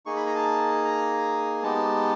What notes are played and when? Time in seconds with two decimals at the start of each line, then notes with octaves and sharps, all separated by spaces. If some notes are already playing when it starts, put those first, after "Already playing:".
0.06 A#3 D#4 G#4 C#6
0.17 B5
0.26 A#5
0.35 A5
0.85 A#5
1.63 G#3 B3 D#4 G4 A5